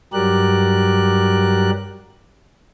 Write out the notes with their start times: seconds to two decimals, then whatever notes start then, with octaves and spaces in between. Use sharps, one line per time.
0.13 G2 F#3 G4 A#4 D5 F#6